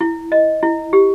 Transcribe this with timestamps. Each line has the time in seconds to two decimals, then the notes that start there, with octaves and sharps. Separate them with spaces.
0.01 E4
0.32 D#5
0.63 E4
0.93 G4